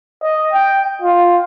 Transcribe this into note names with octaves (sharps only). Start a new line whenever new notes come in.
D#5
G5
F4